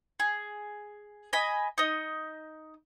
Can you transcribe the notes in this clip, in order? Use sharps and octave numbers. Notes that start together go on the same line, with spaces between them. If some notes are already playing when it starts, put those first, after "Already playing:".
G#4
D#5 G#5 B5
D#4 D#5